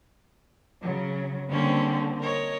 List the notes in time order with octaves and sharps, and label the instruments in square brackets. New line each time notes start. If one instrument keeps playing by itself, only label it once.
[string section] C#3 F#3
[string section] D3 C4 [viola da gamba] G3 A#3 C#4
[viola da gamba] A#4 C#5 D#5